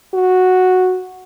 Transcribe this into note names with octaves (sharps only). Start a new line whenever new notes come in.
F#4